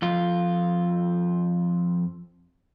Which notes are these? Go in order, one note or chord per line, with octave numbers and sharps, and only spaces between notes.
F2 F4